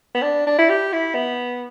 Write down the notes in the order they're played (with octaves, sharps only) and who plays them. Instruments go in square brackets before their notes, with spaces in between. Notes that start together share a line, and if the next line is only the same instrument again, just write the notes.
[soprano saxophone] B3
D4
D4
E4
G4
E4
B3